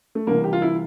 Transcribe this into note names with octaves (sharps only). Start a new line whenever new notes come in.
A3
C2 C3 E3 A#3
G4
F4
E4